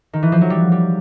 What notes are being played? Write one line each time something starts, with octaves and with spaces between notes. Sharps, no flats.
D#3
E3
F3
F#3
G3
G3